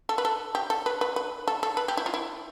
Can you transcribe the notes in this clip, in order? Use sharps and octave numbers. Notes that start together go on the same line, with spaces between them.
A4
B4
A4
G4
A4
B4
B4
B4
A4
A4
B4
G4
E4
F4
E4